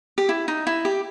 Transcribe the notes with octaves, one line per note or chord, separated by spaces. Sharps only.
G4
E4
D#4
E4
G4